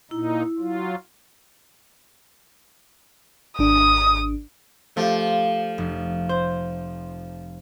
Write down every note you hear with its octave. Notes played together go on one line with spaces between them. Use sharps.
A#2 D#4 E4
F#3 F4
G#1 D4 D#6
F3 A3 G4
F1
C5